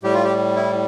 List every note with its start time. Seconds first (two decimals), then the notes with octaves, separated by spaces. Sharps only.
0.03 A2 G3 G4
0.14 F4
0.24 G4
0.56 E4